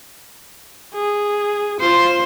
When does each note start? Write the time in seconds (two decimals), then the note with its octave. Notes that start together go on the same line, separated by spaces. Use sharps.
0.94 G#4
1.80 F4 C5